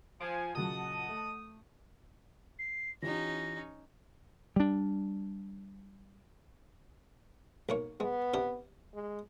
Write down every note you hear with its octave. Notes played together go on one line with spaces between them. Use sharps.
F3 G#5 D7
A#2 C#3 F#3 D#5 F#5 A5 D#6
A3
C7
E3 C#4 D#4 F4 G4 A#6
G3 D4
B1 A#3 C#5
G#3 B3
C3 D4 G4
G#3